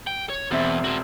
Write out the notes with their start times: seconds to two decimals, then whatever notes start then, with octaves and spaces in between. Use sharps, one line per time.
0.07 G5
0.30 C#5
0.51 E1 E2 C4 E5
0.84 F#4 C5